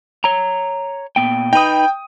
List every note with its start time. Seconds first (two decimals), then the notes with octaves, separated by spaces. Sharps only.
0.24 C#5 A#5
1.16 A#2 B3 G5
1.53 D#4 B4 G5 D#6